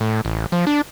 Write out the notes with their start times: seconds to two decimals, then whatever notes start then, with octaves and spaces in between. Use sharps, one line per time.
0.01 A2
0.25 A1
0.52 F3
0.67 D4